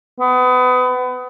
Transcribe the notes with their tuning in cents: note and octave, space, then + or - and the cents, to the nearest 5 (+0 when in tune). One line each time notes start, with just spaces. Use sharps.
B3 +30